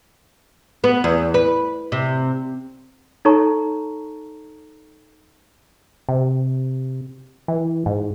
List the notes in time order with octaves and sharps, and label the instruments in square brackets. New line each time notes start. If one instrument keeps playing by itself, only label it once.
[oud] B3
E2
B4
C3
[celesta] D#4 A4 C#5 A5 A#5 C#6
[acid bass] C3
E3
G#2